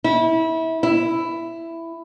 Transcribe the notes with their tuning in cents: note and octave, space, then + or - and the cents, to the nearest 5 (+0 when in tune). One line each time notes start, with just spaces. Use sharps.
E4 -25
E4 +10